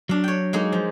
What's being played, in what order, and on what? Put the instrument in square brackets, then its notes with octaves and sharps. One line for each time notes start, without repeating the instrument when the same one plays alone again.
[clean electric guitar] F#3 [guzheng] D4 F5
[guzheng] C#5 G5
G#3 A#3 D#4
F3